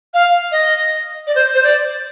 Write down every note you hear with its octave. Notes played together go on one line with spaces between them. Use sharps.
F5
D#5
D5
C5
C5
D5